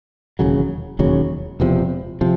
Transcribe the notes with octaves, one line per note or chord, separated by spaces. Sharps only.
E1 D#2 C#3 F#3
E1 D#2 C#3 F#3
E1 E2 C3 F3
C3 F3